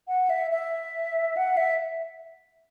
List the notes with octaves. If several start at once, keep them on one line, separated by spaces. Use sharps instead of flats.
F#5
E5
E5
F#5
E5